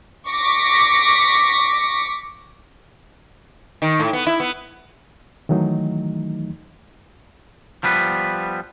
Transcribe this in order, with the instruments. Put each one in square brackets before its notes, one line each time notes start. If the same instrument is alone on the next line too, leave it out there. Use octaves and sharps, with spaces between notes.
[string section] C#6 D6 A#6 B6
[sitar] D#3
A2
B3
E4
B3
[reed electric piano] D#3 E3 F#3 A3 D#4
[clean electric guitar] F3 G3 B3 B4